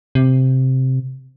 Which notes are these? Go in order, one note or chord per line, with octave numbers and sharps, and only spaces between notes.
C3